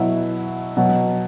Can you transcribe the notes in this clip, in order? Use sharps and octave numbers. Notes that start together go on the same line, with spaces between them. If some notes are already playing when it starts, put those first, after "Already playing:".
Already playing: B2 F#3 E4
B2 F#3